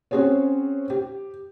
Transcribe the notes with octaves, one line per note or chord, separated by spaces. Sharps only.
C4 C#4 F#4 G#4 C5 C#5
G4